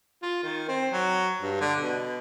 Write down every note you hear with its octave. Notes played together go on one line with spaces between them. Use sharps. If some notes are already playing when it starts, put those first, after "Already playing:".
F4
D#3
C4
F#3
G2
D3
B2